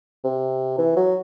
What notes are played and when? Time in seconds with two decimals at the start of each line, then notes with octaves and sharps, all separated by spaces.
0.24 C3
0.78 E3
0.96 F#3